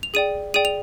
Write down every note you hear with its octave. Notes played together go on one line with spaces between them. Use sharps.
F7
G#4 D5 G5 D#7
G#4 D5 G5 D#7
F7